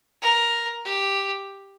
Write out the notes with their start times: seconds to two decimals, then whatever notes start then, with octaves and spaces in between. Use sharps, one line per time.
0.22 A#4
0.85 G4